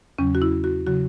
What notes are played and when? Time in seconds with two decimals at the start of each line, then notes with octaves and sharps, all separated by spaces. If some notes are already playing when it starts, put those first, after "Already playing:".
0.18 E2 C#3 F#3 C#4
0.35 F#4
0.42 E4
0.64 F#4
0.87 C#3 F#3 F#4